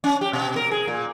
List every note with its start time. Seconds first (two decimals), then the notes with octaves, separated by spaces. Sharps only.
0.04 C#4
0.21 G4
0.33 B2
0.56 A#4
0.71 G#4
0.88 A#2